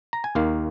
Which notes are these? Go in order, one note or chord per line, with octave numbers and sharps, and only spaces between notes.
A#5
G#5
D#2 D#3 A#3 F5